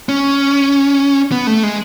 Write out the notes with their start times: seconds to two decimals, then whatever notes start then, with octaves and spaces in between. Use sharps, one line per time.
0.09 C#4
1.32 B3
1.47 A3
1.63 G#3